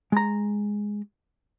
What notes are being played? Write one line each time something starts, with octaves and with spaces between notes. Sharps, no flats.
G#3 A#5